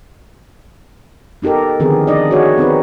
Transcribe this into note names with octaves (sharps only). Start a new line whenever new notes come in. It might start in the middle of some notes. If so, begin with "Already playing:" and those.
B3 D#4 G4 A4 A#4
D3 D#3 F3 B3 C4 G#4
D4 D#4 D5 D#5
F#4 G#4 C#5
B3 C4 D#4 B4